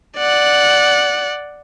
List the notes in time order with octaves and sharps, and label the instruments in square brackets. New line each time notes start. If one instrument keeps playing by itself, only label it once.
[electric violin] D5 F#5